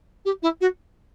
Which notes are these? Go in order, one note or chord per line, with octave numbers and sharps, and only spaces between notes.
G4
E4
F#4